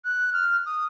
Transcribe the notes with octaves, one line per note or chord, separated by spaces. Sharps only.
F#6
F6
D#6